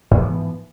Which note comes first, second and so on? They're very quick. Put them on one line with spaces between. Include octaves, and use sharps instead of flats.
G#2 E3 F3 B3